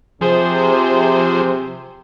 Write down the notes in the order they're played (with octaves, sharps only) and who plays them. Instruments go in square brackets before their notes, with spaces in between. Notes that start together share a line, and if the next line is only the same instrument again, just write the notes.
[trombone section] C3 [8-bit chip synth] F3 G#4 C5